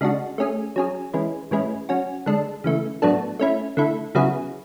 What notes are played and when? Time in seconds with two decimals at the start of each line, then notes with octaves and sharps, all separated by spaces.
0.01 C#3 G#3 D4 F#4
0.38 A3 C#4 G#4
0.76 F#3 C#4 G#4
1.14 E3 G#3 C#4 E4
1.51 A2 E3 G#3 C#4 E4
1.89 F#3 C#4 F#4
2.26 D3 G#3 D4 A4
2.64 C#3 E3 A3
3.02 A2 F#3 B3 D4 A4
3.39 A3 C#4 E4
3.77 D3 A3 E4
4.15 C#3 F#3 B3 E4 G#4